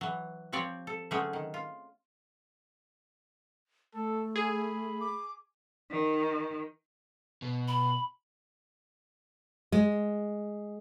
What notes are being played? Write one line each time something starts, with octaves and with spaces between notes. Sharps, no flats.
E3 F#3
F3 C4 G4 C#5 D5
A4
D3 F#3 A3 C4 C#4 G#4
D#3
F4
A3 A4
G#4 B5
D6
D#3
B2
B5
G#3